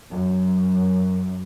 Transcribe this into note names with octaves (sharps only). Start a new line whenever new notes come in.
F#2